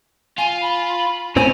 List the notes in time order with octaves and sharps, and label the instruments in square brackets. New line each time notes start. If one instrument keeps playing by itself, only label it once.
[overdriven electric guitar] F4 [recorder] G#5
[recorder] B5
[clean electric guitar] A2 C4 [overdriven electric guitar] C#4 [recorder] G#5